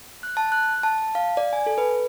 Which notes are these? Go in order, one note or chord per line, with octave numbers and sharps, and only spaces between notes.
F#6
A5
F#6
A5
A5
F5
D5
G#5
A4
B4